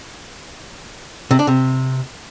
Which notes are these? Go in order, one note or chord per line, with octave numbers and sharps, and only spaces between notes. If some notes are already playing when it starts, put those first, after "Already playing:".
C3
D4
C3